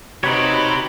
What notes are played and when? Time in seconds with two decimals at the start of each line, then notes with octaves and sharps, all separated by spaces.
0.24 C3 D#4 F#4 G4 B4 C#5 B5